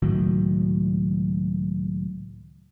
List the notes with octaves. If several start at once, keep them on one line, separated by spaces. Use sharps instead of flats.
C#2 A2 D#3 F#3